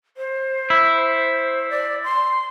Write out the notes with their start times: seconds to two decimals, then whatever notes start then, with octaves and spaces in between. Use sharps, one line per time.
0.17 C5
0.70 E4
1.70 D5
2.04 C6